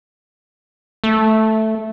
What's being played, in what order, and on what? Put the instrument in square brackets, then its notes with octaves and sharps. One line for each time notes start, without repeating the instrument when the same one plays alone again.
[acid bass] A3